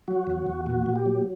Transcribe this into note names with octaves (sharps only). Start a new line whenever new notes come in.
F#3 F#4
E2
E2
A#2 F#4
A#2
G4
F#3